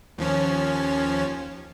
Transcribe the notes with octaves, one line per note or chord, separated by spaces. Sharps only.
D#2 F3 C#4